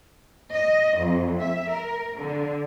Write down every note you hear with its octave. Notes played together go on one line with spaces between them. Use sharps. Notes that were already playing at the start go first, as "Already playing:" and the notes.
D#5
F2
E5
A#4
D3